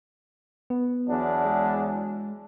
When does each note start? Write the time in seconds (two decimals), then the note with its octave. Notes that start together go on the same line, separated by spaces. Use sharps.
0.70 B3
1.07 E2 F#3 D4
1.45 G#3